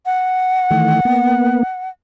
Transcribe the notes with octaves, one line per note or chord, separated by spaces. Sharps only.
F#5
D#3 E3 A3
A#3 B3